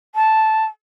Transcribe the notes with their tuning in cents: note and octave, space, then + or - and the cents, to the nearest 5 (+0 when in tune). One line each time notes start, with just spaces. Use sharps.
A5 -5